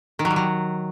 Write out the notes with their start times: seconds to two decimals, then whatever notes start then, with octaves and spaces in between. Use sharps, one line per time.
0.19 D#3
0.25 F#3
0.31 G3
0.36 F#3